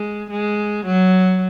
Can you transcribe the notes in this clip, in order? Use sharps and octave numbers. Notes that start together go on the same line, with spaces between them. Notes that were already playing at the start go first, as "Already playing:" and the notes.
Already playing: G#3
G#3
F#3